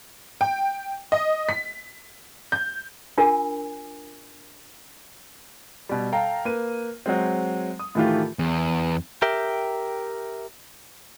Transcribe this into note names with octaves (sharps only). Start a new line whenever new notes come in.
G5
D#5
B6
G6
D4 F4 A#4 G#5
B2 G3
A4 F5 G5 A5 A#5
A#3 B4 D#7
F#3 G#3 C4
D#6
A2 D#3 E3 A3 F4 G4
E2
G4 A#4 E5 G5